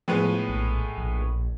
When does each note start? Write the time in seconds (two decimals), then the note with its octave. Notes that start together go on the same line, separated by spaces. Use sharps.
0.08 A2 F3 G#3 B3
0.49 A#1
0.97 A#1